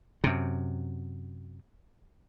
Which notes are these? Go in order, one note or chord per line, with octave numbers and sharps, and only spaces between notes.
F#2 C3